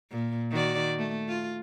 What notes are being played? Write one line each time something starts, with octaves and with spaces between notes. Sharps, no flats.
A#2
D#3 F#4 D5
A3
F4